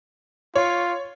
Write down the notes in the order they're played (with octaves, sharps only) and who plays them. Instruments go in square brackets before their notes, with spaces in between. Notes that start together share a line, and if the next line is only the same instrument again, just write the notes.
[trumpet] F4 [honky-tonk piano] C#5